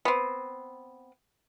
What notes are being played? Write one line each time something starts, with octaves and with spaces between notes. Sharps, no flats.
B3 C4